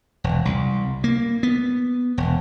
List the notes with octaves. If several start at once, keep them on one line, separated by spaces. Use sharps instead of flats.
E1
C2
A#3
B3
E1